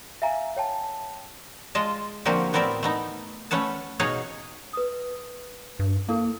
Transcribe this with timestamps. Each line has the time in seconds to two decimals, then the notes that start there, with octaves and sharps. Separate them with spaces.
0.22 E5 F5 G#5 A#5
0.57 C#5 G5 A5
1.75 G#3 F4 D#5 A5
2.25 D3 F3 A#3 C4 F#4 G4
2.53 A2 B3 C4 A#4 D5 E5
2.83 A3 B3 D#4
3.51 A3 C#4 B4 F#5 A5
3.99 B2 D#4 G#4 C#5 F5 F#5
4.73 B4 D#6
5.79 G2
6.08 A#3 E4 A4 A#4